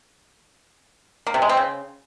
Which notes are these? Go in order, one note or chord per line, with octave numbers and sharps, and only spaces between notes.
A#3
C3
G#3
C4
C#3